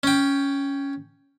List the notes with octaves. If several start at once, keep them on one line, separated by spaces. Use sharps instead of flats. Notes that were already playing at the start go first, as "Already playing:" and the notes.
C#4 G5